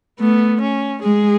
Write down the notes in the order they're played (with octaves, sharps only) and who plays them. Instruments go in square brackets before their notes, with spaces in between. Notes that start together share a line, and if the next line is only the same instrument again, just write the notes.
[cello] A3 [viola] B3
[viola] C#4
[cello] G#3 [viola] G#4